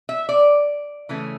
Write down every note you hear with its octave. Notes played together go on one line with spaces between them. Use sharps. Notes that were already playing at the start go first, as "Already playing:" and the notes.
E5
D5
C#3 E3 A3 C#4